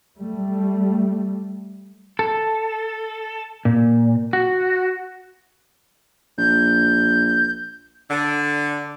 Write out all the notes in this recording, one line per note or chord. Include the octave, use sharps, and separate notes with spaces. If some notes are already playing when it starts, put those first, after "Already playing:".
G3 A3
A4
A#2
F#4
A#1 G6
D3